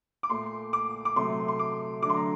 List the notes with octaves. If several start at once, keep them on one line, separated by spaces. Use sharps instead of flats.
D6
A#2 A3 C6
D6
D6
C3 F#3 A3 C6
C6
D6
D3 F#3 A3 D6
C6
A#5